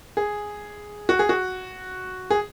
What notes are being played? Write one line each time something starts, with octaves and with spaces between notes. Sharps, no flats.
G#4
F#4
G#4
F#4
G#4